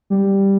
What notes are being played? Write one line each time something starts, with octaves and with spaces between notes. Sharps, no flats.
G3